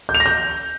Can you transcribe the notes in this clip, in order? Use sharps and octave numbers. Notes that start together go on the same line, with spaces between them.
G6
F7
A#6
G6